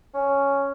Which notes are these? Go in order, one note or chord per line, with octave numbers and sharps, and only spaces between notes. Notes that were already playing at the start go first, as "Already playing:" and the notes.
C#4